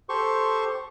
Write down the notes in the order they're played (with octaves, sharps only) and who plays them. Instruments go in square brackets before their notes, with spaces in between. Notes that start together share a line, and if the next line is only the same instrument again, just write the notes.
[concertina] G4 A4 C5 C6 C#6